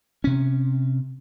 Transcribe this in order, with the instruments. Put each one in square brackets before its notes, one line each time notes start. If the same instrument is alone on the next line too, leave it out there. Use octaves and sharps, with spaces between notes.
[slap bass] C3 C#4